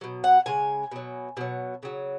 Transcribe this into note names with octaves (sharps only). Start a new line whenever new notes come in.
B2 F#3
F#5
C#3 G#3 G#5
B2 F#3
B2 F#3
C#3 F#3